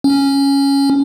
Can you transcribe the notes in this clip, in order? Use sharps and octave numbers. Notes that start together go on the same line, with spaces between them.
C#4